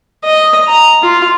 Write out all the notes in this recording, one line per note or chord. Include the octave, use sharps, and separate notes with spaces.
D#5
A#5
F4